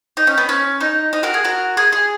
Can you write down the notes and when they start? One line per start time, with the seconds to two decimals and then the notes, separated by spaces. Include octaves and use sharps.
0.17 D#4
0.27 C#4
0.38 B3
0.49 C#4
0.81 D#4
1.13 D#4
1.23 F#4 A#4
1.34 G#4
1.44 F#4 A#4
1.77 G#4
1.93 G#4